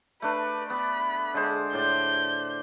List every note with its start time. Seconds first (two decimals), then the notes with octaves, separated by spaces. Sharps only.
0.22 A3 D4 B4
0.70 B3 B5
1.34 D3 G#3 C5
1.73 A2 D5 G6